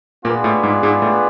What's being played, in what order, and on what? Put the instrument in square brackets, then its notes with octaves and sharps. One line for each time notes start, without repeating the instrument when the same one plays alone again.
[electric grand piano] A#2 A#3 [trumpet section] B3 D4 F4 G#4 B4
[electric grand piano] A2 A3
G#2 G#3
G#2 G#3
A2 A3